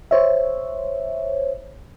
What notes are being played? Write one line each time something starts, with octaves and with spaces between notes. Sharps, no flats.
C5 C#5 E5